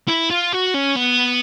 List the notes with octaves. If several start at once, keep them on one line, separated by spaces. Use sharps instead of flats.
E4
F4
F#4
C#4
B3